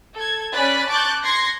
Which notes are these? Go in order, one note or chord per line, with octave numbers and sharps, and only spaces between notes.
A4 G#6
C#4 D5 G#5 B5 F#6 A6
A5 C#6 D6 F#6 G6 A6
C6 G#6 A#6 C7 C#7